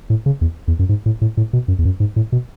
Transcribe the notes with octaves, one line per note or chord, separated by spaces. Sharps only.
A2
C#3
E2
E2
F#2
G#2
A2
A2
A2
B2
F#2
E2
F#2
G#2
A2
B2